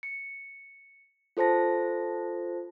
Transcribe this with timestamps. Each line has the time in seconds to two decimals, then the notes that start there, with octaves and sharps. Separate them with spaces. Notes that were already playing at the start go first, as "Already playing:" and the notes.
0.03 C#7
1.37 F4 A4 C5 A5 A#6